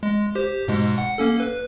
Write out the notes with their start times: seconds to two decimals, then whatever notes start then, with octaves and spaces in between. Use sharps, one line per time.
0.03 G#3
0.35 G4 C5
0.68 G#2 B2 G#3
0.98 F#5
1.18 A#3 C#4 A4
1.40 B4 F#6